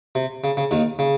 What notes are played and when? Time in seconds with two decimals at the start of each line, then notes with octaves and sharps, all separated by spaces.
0.15 C3
0.44 C#3
0.57 C#3
0.71 D#2 D#3
0.99 C#3